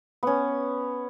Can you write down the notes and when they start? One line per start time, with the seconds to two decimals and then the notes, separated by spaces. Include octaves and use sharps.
0.23 B3 C#4